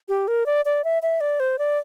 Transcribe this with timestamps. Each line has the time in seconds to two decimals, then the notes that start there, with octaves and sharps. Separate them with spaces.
0.09 G4
0.28 A#4
0.46 D5
0.65 D5
0.84 E5
1.02 E5
1.21 D5
1.40 C5
1.59 D5